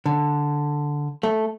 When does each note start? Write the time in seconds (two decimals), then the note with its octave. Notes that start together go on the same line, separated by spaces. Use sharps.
0.06 D3
1.23 A3